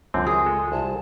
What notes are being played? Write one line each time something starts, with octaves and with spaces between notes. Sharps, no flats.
C#2 F#2 D3 C4 F4
G#4 A#4
G#3 A4
C2 A5